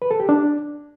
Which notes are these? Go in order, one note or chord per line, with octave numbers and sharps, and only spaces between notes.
B4
A4
G4
D4